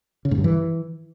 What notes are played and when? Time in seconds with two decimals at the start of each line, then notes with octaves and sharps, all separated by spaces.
0.25 C#3
0.31 G#2
0.38 G2
0.44 E3